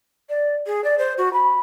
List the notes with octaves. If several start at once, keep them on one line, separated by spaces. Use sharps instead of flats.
D5
G#4
D5
C5
F#4
B5